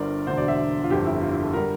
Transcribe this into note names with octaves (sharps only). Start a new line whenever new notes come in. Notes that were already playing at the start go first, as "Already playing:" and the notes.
Already playing: G1 G2 D3 A#4 C5 D5
E1 D2 D3 C5
D5
E5
F4
G1 F2 D3 G4
E4
F4
E4
A4
D3 G3 A#4